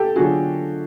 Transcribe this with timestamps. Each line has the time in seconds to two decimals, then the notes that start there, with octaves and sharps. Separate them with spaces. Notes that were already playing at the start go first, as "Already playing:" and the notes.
Already playing: G4 A4
0.16 D3 F#3 B3 D4 F4 F#4 G#4